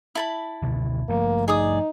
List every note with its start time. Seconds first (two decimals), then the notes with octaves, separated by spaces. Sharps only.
0.15 E4 A5 B5
0.62 C#2 B2 D3
1.09 G2 F3 A3 A#3
1.48 D#4 G#4 D5 D#6